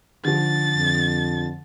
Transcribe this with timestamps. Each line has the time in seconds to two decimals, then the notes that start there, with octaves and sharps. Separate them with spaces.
0.25 D3 F3 A6
0.76 F2